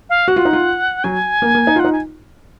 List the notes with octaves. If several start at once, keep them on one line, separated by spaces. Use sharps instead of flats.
F5
F#4 F#5
F4
D#4
F4
F#3 F#4 G#5
A#3 A#4
A#3 A#4
D#4
F4 F#5
D#4
G#5